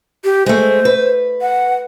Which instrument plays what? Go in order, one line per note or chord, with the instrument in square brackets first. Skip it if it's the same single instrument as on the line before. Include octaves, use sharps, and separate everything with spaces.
[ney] G4
[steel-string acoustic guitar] G#3 A3 [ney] C5
[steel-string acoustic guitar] B4
[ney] F#5